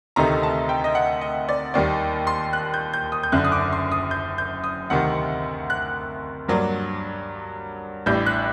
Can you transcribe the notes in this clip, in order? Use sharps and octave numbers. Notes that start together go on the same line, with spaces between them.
D2 C3 D#3 A3 D#4 A#5
A5
G5
D#5
F#5
D#5
D5
D#2 D#3 G3 D5
C6
F#6
G6
G6
D#6
G6
F#1 F#2 D3 F#6
D#6
D6
C6
D#6
G6
G6
D#6
D2 C3 D#3 F#5
F#6
G2 F#3 A#3 D4
A1 A2 G3 D4 G6
F#6